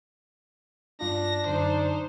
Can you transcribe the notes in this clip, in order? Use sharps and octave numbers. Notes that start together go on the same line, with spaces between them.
G2 D4 F4 A#6
F#2 D3 D#4 C5